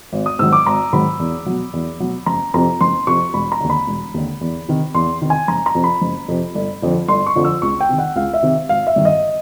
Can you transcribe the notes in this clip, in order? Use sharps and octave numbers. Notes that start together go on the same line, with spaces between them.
G#1
D#6
G#2 D#3 F#3 E6
D6
G#1 A#5
G#2 D#3 F#3 B5
E2
B2 F#3
E2
B2 F#3
F#1 A#5
F2 C3 A#5
F#1 C6
F2 C3 C#6
E1 B5
A#5
D#2 D3
B5
E1
D#2 D3
E2
C3 D#3
E2 C6
C3 D#3
G#5
F#1 A#5
A#5
F2 C3
B5
F#1
F2 C3
G1
F2 D3 F3
G1 C6
C#6
F2 D3 F3
E6
C#2 C#6
G5
C3 D#3
F#5
C#2 F5
E5
C3 D#3
G#1 F5
E5
G2 D#3
D#5